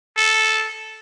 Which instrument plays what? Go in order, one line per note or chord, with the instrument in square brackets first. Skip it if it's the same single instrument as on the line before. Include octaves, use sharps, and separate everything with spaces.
[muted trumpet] A4